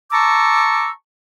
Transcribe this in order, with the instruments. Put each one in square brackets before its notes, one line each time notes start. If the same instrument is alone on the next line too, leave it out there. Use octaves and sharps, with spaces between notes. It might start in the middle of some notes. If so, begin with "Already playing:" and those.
[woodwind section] A5 A#5 C#6 D6 E6